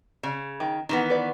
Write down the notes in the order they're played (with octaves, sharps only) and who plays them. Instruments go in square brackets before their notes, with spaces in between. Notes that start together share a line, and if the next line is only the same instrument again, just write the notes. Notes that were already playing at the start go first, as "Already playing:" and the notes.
[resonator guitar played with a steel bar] C#3
[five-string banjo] D#3
[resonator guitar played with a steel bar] D#3 E3 B3 [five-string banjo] D#4
[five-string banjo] B4 D5